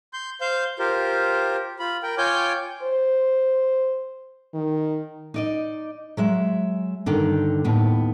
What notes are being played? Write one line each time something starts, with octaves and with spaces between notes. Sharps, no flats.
C6 G6
C5 F5 G6
F4 G4 A#4 C5
F4 B5
A#4 G5
F4 C#5 G5 G#5 D6 G6
C5
D#3
D#4 D5 D#5
F#3 G#3 E5
G2 D3 D#3
D#2 A2 B3